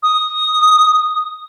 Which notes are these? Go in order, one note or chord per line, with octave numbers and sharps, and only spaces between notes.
D#6